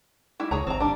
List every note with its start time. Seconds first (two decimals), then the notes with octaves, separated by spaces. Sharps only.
0.40 G3 E4
0.51 C#2 G#4 C#5 A#5
0.67 G#1 C4 A#5
0.80 G3 D4